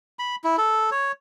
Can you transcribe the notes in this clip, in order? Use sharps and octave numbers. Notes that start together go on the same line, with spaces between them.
B5
E4
A4
C#5